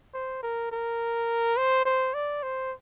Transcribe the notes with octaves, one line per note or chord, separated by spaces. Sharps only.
C5
A#4
A#4
C5
C5
D5
C5